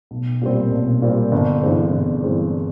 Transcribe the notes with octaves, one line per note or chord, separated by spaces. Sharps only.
B1
A#2 G3 C4
B1
A#2 G3 C4
G1
G2 E3 G#3 C4
G1
G2 E3 G#3 C4